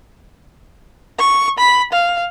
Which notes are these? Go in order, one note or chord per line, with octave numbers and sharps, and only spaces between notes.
C#6
B5
F5